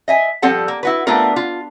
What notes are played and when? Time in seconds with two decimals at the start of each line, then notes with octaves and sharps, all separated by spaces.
0.08 D#5 E5 G#5
0.42 F3 G3 C4 A4 F#5 A5
0.68 A#3
0.83 E4 F#4 B4
1.07 A3 B3 C4 D4 F4 A#4
1.36 F4